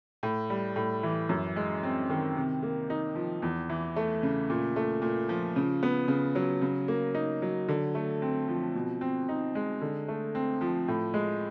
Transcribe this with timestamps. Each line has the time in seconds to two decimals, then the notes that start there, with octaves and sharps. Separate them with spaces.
0.23 A2
0.50 G3
0.76 A2
1.03 E3
1.29 F#2
1.56 G#3
1.83 C4
2.10 D#3
2.36 C3
2.63 A#3
2.90 D#4
3.15 F3
3.42 E2
3.69 E3
3.96 A3
4.23 C#3
4.50 A#2
4.76 A3
5.02 A#2
5.29 F3
5.56 C#3
5.83 B3
6.08 C#3
6.35 F#3
6.62 C#3
6.88 A#3
7.15 D#4
7.42 F#3
7.69 D3
7.95 A3
8.22 C4
8.48 F3
8.75 B2
9.01 C4
9.29 D#4
9.55 G#3
9.82 D3
10.08 A3
10.35 C4
10.61 F3
10.88 A2
11.14 G#3